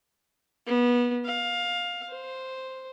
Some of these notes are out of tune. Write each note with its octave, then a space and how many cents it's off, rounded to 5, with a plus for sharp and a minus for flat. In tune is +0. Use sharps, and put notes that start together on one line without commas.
B3 -25
F5 +15
C5 +0